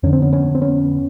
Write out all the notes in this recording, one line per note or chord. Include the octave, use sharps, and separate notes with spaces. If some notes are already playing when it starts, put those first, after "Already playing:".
F2 D3 C#4
C4
B3 C#4
B3 C#4
C4
B3 C#4